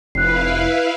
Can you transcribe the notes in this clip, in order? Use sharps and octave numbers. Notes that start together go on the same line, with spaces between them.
F1 E4 B4 F5 F#6 C7